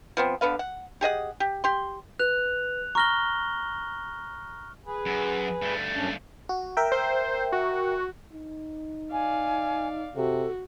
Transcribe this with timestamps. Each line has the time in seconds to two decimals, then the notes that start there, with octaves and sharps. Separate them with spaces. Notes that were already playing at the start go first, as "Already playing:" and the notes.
0.17 F3 B3 C4
0.41 D3 B3 B4 F5
0.59 F#5
1.01 G4 G#4 D#5 F#5
1.40 G4
1.64 G4 C6
2.19 B4 F#6 F7
2.95 A#5 C#6 F6 A#6 G7
4.86 G#4 B4
5.06 F#2
5.62 G2 A3
5.95 F#2 C#4 D4
6.49 F#4
6.77 A#4 E5 G5
6.92 C5
7.52 F#4
8.32 D#4
9.12 D5 F5 G#5
10.16 C3 F#4 A4